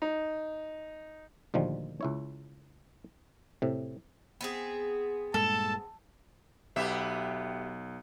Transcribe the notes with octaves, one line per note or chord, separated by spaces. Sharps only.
D#4
D2 A#2 D#3 F3 G3
C#2 E4 C#5
A2 C3
B3 C4 G#4
G2 A#2 G#3 A4 A5
B1 B3 G4 E5